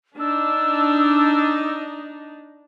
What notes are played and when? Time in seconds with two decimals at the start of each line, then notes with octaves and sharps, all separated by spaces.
0.19 D4 D#4 E6